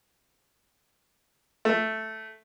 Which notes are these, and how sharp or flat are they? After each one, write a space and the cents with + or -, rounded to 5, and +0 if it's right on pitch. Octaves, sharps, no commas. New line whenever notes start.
A3 -5